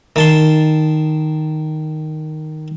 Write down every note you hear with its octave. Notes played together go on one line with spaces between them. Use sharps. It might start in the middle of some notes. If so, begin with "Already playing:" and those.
D#3 A5 C6